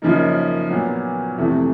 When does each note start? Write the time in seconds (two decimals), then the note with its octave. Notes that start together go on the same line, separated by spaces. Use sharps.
0.02 F#2 C#3 F3 A#3 D#4
0.70 A#2 F#3 B3
1.37 F2 C3 E3 A3